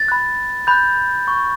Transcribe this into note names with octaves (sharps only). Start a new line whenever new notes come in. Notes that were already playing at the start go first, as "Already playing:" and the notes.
Already playing: A6
B5 F#6
B5 F#6 G6
C#6 G6